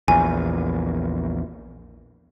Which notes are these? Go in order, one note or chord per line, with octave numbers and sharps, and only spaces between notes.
A#1 E2 G#5